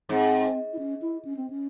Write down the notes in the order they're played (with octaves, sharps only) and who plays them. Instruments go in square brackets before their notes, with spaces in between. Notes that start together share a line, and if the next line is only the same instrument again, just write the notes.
[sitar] G#2 [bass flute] C4
[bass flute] E4
C#4
E4
C#4
C4
C#4